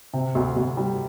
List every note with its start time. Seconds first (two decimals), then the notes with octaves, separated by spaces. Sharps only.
0.13 C3
0.35 D2
0.56 D2
0.77 G3